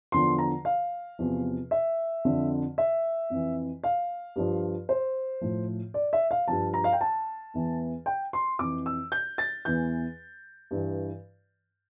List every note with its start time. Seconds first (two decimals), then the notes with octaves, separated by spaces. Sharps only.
0.12 E2 D3 F3 C6
0.39 A#5
0.65 F5
1.19 E2 C3 F3
1.71 E5
2.25 F2 D3 F3
2.78 E5
3.30 F2 E3
3.84 F5
4.36 G2 F3
4.89 C5
5.41 A2 F3
5.94 D5
6.13 E5
6.31 F5
6.48 G2 F3 A5
6.74 A#5
6.84 F5
6.93 G5
7.01 A5
7.54 E2 E3
8.06 G5
8.33 C6
8.59 F2 E3 D6
8.86 E6
9.12 G6
9.38 A6
9.65 E2 E3 G6
10.71 G2 E3